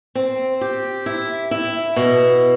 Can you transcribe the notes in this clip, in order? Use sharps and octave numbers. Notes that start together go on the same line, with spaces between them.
C4
G4
E4
E4
B2